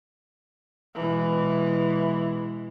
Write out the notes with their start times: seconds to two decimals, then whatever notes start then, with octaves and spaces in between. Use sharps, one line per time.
0.96 B2 E3 G#3